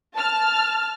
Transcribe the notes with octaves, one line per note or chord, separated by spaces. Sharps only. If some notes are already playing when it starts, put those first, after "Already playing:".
A5 F6